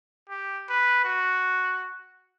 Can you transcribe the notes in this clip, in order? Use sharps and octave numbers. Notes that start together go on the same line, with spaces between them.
G4
B4
F#4